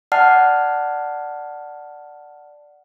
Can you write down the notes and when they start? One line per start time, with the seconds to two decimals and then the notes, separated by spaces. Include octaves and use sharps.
0.12 D5 F#5 A5 F6 C7